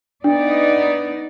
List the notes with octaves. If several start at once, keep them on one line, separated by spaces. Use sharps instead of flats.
B3 D4 D#4 D5